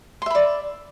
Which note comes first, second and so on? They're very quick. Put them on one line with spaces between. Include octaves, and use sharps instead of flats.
C6 E5 B5 D5